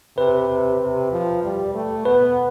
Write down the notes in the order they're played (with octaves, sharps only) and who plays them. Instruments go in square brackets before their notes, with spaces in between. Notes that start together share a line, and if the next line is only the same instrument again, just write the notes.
[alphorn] C3 [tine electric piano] B4
[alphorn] C3
C3
F3
G3
A3
[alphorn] B3 [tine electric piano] B4